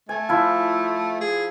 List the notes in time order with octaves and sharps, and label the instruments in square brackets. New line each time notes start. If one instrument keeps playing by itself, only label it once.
[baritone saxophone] A3 [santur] G#5
[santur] F3 E4 G5
[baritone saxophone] G#4